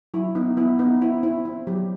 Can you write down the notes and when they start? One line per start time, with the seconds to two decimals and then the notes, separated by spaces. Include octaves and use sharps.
0.14 F#3 E4
0.35 B3 D#4
0.57 B3 E4
0.79 B3 D#4
1.02 C4 E4
1.23 C4 E4
1.45 C4
1.67 F#3 G4